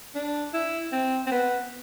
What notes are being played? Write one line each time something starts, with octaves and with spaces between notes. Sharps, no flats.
D4
E4
C4
C4
B3